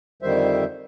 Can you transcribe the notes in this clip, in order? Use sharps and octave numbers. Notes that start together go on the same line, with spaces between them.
F2 D3 D#3 G3 C5 E5